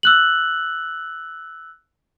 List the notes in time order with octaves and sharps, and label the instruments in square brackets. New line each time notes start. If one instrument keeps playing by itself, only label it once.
[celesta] E6 F#6 F#7